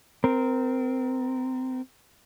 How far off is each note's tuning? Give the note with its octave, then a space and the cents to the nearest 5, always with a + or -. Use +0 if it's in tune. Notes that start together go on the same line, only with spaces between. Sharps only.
C4 -25 A#4 +0